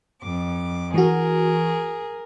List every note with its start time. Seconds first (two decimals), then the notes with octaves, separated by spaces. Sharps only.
0.22 F2 D6
0.94 E3 F#4 G#4 A#4